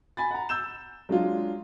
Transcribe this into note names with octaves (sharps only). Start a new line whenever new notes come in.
G#5 B5 A6
F#5 A#5
E6 G6 E7
F#3 G#3 D4 F4